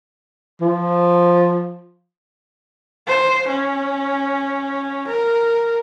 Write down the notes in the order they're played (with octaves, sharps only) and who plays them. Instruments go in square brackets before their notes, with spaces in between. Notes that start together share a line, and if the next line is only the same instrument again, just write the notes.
[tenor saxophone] F3
[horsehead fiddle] C5
C#4
A#4